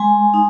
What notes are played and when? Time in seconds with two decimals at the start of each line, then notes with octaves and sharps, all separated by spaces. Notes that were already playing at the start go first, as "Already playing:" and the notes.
Already playing: G#3 G#5 C6
0.34 D#4